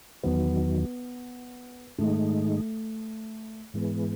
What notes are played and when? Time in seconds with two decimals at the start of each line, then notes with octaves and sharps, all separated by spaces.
0.23 E2 D#3 F#3 B3
1.98 G#2 D#3 G#3 A3 D#4
3.74 G#2 E3 G#3 B3